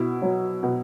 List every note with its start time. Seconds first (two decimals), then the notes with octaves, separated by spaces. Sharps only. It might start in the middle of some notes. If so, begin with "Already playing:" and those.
Already playing: B2 E4
0.22 F#3
0.63 B2